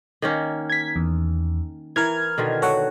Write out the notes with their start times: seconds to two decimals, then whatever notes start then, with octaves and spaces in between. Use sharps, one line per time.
0.22 D#3 A#3 C#4
0.70 G#6 B6
0.96 E2
1.96 E3 A#4 F6 G#6
2.38 B2 D3 D#3
2.62 F#4 A4 C#5 F#5